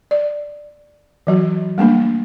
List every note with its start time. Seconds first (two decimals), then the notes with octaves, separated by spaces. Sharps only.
0.11 D5
1.27 E3 F#3 F#4
1.78 G3 A3 A#3 D4